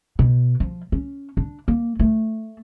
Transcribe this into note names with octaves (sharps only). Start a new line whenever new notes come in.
B2
F3
C#4
D4
A#3
A3